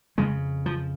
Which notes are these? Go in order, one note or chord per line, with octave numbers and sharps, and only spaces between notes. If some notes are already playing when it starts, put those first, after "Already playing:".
F2 C#3 G#3
F3